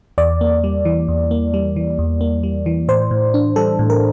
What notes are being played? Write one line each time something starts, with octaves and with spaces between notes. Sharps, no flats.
E2 D5
A#3
G3
E3
E2
A#3
G3
E3
E2
A#3
G3
E3
A2 C5
A2
D4
G3 A4
A2
A#4